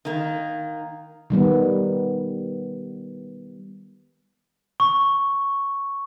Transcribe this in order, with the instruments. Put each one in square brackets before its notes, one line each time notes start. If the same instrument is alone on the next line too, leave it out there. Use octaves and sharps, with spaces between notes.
[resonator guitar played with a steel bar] D#3 A#3
[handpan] D#3 G3 B3
[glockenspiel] C#6